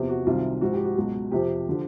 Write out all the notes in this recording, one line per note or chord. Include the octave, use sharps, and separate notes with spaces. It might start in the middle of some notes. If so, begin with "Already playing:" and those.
Already playing: E2 C3 F3 G4
F#4
C2 C3 D#3 F#3 F4
G#2 F3 F#4
G4
F#4
C#2 B2 F#3
F2 C3 F3 G4
D3 F3